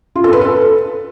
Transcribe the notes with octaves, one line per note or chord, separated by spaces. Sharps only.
F4
A4
B4
A4